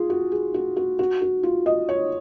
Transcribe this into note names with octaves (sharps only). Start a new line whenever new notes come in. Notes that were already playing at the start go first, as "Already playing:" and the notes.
Already playing: F4 G#4
F#4
G#4
F#4
F#4
F#4
F#4
F4
D#5
C#5